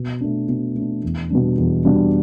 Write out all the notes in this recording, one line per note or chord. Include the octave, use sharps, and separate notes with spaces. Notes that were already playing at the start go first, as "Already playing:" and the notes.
Already playing: B2
A3 D4
B2
A3 D4
E2
B2 G3 D4
E2
B2 G3 D4